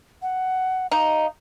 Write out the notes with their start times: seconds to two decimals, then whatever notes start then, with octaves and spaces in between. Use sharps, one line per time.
0.22 F#5
0.91 D#4 F5